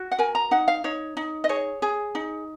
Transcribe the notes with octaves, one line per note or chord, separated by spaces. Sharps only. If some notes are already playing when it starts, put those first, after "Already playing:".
Already playing: F#4
F#5
A#4 G#5
A#5
D#4 F#5
F5
D#4 C#5
D#4
D#5
G#4 C#5
G#4
D#4